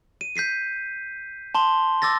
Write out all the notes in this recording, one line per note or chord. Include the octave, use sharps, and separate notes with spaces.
D#7
G6 B6 C7 D#7
A5 C6 G7
D6 E6 A6 A#6